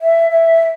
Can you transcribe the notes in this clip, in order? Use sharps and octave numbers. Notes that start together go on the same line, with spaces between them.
E5
E5